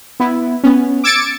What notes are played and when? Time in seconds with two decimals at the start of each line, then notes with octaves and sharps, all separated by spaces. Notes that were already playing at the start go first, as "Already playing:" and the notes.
0.20 B3 E4
0.64 B3 C#4
1.04 D6 E6 G#6 A6 C#7 D7